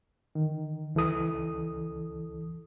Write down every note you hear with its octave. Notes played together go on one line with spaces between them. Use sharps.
D#3
C#2 E3 A4 D#6